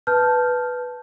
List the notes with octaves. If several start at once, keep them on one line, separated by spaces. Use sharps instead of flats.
B4 A5 F6 G6